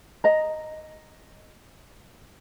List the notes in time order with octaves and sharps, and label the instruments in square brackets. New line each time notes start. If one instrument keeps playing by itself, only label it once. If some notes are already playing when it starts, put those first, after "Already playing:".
[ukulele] D#5 A#5